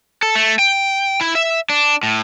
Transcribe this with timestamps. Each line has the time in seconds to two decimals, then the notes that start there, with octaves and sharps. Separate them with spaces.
0.23 A4
0.35 A3
0.59 G5
1.21 E4
1.35 E5
1.69 D4
2.03 A2